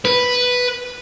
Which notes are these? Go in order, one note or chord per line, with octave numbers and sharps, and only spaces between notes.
B4